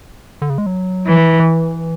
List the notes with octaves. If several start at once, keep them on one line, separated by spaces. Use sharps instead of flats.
D3
C#3
G#3
F#3
E3
E3